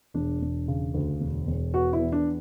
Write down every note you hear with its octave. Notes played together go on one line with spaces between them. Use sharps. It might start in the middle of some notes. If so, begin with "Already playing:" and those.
E1 D4
E1
C#3
D2
E1
E1
B3 F#4
E4
E2
D4